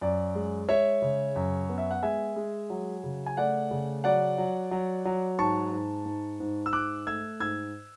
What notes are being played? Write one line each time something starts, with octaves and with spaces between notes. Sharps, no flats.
F#2 D5
G#3
G#3 C#5 E5
C#3
F#2
B3
E5
F#5
G#3 E5 G#5
G#3
F#3
C#3
G#5
A3 D5 F#5
C#3
F#3 D5 F#5
F#3
F#3
F#3
G#2 A5 C#6
G#2
G#2
G#2
E6
G#2 D6 F#6
A3 E6 G#6
G#2 E6 G#6